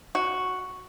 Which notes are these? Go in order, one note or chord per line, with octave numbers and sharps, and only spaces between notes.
F#4